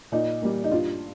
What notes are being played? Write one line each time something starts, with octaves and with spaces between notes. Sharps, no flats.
A#2 D#4
G3 A#3
D#4
G2 F4